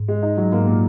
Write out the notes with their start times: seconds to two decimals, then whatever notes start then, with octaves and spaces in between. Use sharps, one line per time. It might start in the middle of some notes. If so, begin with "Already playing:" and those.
Already playing: G#2
0.08 G#3
0.23 D#4
0.37 F#3
0.52 G#2 A#3
0.67 A#2